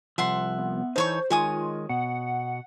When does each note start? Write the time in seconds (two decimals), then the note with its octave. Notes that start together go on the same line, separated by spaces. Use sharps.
0.18 C2 F3 E5 F#5 C6
0.59 B3
0.96 E3 D#4 A4 C5 C#5 C#6
1.30 D#3 G#3 F4 C#5 G#5 D#6
1.89 B2 F#5